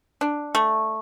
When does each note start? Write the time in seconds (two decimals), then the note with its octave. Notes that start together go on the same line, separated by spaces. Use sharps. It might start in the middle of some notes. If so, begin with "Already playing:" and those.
0.21 D4
0.55 A3